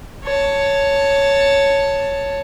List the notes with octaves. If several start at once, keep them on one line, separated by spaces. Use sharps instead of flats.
C#5 A5